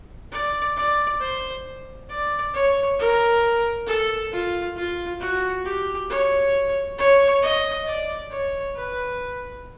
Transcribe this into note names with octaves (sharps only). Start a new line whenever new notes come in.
D5
D5
C5
D5
C#5
A#4
A4
F4
F4
F#4
G4
C#5
C#5
D#5
D5
C#5
B4